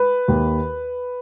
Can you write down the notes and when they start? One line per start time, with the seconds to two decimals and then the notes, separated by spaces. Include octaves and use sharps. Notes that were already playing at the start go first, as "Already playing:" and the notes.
Already playing: B4
0.28 D#2